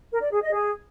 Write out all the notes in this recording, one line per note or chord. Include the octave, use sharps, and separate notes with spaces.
A#4
D5
G#4
D#5
G#4